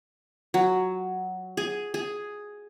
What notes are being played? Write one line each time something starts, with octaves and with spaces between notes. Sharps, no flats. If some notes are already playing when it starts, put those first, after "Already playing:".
F#3
G#4
G#4